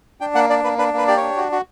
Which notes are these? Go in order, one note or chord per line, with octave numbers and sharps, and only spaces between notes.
D4 G5
A#3 F#5
D4 D5
A#3 B4
D4 B4
A#3 B4
G4 D5
D4 C#5
F#4
F#4